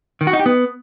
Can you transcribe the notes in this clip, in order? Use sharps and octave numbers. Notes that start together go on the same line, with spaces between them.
D#3
F#4
D#4
G4
B3